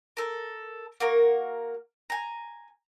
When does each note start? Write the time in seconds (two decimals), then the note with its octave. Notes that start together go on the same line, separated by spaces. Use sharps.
0.17 A4 A#4
1.00 A#3 F#4 A#4
2.10 G#5 A#5